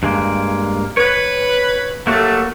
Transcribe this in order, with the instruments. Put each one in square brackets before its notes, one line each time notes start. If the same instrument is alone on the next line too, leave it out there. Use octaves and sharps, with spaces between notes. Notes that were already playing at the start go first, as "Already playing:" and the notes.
[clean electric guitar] G2 G#3 A#3
[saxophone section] B4 [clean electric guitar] C#5
[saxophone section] F#3 G3 A3 [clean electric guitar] A#3 F#4